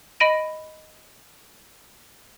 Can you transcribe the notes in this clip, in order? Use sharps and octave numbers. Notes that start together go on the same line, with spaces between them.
D#5 B5 A#6 D7 D#7